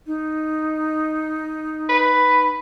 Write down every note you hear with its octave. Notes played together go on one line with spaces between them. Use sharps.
D#4
B4